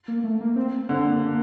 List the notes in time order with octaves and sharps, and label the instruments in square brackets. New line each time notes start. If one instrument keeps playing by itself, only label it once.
[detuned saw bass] A#3
A3
A#3
C4
[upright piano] D3 [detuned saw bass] C4
[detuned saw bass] A#3